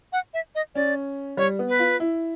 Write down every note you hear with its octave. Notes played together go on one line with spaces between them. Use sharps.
F#5
E5
D#5
C#4 D5
G3 C#5
B3
B4
F4
E4